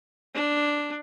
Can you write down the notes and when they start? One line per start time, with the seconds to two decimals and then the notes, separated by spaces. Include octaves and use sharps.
0.35 D4